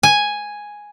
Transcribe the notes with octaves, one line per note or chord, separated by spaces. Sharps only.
G#5